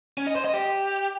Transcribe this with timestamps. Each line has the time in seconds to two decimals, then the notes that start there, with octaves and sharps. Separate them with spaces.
0.18 C#4
0.27 D#5
0.36 C5
0.45 D#5
0.54 G4